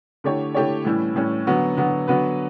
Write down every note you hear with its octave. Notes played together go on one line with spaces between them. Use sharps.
D3 A3 E4 G4 C#5
D3 A3 E4 G4 C#5
A2 E3 G3 C#4 E4
A2 E3 G3 C#4 E4
D3 F#3 B3 F#4
D3 F#3 B3 F#4
D3 F#3 B3 F#4 B4